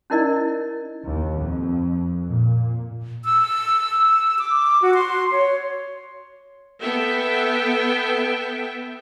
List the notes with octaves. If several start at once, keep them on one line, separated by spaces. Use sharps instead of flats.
C#4 D#4 E4 A#4 D5 D#5
D#2
F2
A#2
E6
D6
F#4
C6
C#5
B3 A4 E5 G5